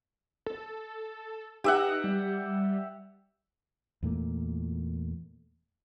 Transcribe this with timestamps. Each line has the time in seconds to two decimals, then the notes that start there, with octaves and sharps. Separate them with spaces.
0.46 A4
1.64 D#4 G4 E5 F#5
2.04 G3
4.03 E2 A#2 A3 A#3